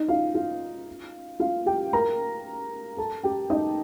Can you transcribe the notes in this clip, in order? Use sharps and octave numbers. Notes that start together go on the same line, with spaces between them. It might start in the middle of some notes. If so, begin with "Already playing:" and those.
Already playing: D#4
F4 F5
F4 F5
F4 F5
G4 G5
A#4 A#5
A4 A5
G4 G5
D#4 D#5